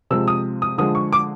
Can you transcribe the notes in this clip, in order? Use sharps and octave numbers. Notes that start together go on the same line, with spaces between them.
C3 F3 G#3 E6
D#6
D#6
D3 F3 G#3 D#6
C#6
D6